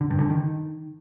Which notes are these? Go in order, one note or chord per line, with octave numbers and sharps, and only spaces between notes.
D3
G2
D3
D#3